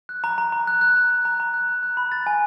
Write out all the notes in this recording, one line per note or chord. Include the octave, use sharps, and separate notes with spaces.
F#6
A#5
A#5
A#5
F#6
F#6
A#5
F#6
A#5
A#5
F#6
F#6
F#6
B5
A6
G#5